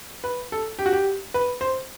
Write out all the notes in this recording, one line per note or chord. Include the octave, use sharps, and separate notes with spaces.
B4
A4
G4
F#4
G4
B4
C5